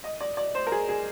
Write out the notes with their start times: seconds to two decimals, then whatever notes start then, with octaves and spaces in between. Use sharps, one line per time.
0.04 D#5
0.21 D5
0.37 D5
0.55 C5
0.67 A#4
0.72 G#4
0.89 G#4